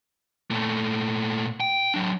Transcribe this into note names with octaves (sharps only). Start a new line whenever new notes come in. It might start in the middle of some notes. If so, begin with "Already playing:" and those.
A#2 A3
G5
F#3 D4